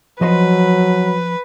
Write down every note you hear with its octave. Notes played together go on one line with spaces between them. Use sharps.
F3 F#3 B4 D#5 C6